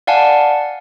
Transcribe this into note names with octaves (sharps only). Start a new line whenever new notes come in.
D5 F5 F#5 G#5 A5